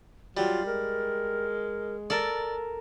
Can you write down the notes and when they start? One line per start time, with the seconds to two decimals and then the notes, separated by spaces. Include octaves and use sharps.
0.37 F#3 G3 F4
0.66 G#3 A#4
2.10 A4 A#4 D5